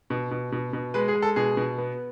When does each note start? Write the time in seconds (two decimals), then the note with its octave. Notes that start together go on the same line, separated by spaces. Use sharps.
0.10 B2
0.31 B2
0.52 B2
0.73 B2
0.94 G#3 B4
1.08 G#4
1.15 G#3
1.22 A4
1.36 B2 G#4
1.57 B2
1.78 B3